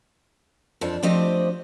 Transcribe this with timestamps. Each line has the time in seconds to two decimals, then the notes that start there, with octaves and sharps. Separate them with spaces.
0.81 F2 F3 D4 A5
1.03 F3 A3 C4 D4 G4 D#5